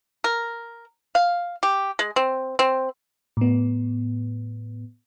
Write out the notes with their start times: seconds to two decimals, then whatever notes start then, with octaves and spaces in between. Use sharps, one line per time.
0.24 A#4
1.15 F5
1.63 G4
1.99 G#3
2.16 C4
2.59 C4
3.37 A2 B3